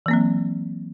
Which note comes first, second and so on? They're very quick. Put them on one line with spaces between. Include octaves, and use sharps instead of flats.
E3 A#3 C4 F#3